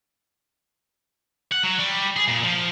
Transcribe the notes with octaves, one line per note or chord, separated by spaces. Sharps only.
F#5
F#3
G3
G#4
A#2
F3